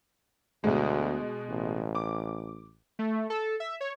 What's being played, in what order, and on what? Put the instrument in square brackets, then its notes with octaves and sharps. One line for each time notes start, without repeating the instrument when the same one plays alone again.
[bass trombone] D2 [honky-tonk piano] B2 G#3
[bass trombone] A1
[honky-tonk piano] D6
[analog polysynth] A3
A4
E5
C#5